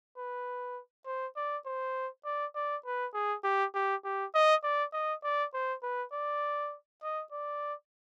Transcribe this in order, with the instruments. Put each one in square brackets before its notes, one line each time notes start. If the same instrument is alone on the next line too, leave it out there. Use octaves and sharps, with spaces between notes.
[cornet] B4
C5
D5
C5
D5
D5
B4
G#4
G4
G4
G4
D#5
D5
D#5
D5
C5
B4
D5
D#5
D5